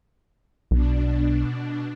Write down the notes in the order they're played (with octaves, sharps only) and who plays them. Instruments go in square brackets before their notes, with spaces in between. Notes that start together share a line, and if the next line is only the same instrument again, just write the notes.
[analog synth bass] B1 [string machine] B2 D4